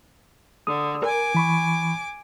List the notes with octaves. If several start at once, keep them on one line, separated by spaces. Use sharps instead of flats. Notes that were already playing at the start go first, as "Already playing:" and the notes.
D3 D#6
A#4 G#5 D6
E3 B5 C#6